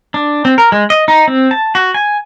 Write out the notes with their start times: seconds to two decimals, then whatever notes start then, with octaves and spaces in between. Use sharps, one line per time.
0.14 D4
0.45 C4
0.58 A#4
0.72 G#3
0.90 D#5
1.08 D#4
1.28 C4
1.51 A5
1.75 F#4
1.94 G#5